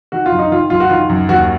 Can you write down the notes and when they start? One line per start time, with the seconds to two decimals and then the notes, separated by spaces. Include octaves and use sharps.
0.12 D#3 F#4
0.26 F4
0.32 F#2
0.39 D#4
0.51 D#3 F4
0.70 F#2 F4
0.80 F#4
0.89 D#3 F4
1.09 F#2
1.29 D#2 F#4